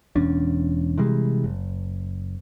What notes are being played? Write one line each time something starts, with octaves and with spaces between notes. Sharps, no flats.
E1 E2 C#4 D4
C3 E3 G3 G#3
F#1